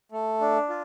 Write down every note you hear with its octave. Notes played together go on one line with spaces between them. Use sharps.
A3
D4
F4